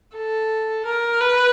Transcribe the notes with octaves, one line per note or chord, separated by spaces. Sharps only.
A4
A#4
B4